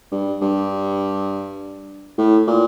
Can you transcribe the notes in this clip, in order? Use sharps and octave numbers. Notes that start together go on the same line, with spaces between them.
G2
G2
A2
A#2